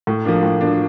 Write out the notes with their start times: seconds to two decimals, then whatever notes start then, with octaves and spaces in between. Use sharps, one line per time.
0.07 A2
0.25 F3 A#3 D4
0.43 A2
0.61 F3 A#3 D4